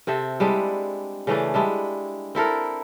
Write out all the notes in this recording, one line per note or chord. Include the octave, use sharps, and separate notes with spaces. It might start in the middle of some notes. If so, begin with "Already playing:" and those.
C3 C4 A4 E5
G3 G#3 D4 E4
C#3 E3 A3 D4
G3 G#3 D4 E4
C4 E4 A4 A#4